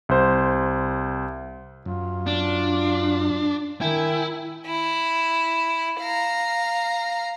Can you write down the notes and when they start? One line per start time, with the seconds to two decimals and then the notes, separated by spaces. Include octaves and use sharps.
0.09 C2 C5
1.86 F#2 F4
2.27 D4
3.81 D#3 E4 G5 G#5
4.66 E4
6.00 F5 A#5